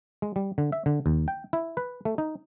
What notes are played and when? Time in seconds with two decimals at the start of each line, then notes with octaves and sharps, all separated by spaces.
0.22 G#3
0.36 G3
0.58 D3
0.72 E5
0.86 D3
1.06 D#2
1.28 G5
1.53 E4
1.77 B4
2.05 A3
2.18 D#4